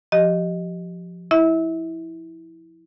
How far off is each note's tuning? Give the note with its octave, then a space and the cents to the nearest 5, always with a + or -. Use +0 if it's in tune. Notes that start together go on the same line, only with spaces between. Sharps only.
F3 +10 G4 -20 D#5 +0
E4 -15 E5 -30